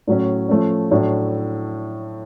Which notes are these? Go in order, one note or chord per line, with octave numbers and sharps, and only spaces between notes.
A2 F#3 C#4
F3 A3 C#4
A2 F#3 A3 D4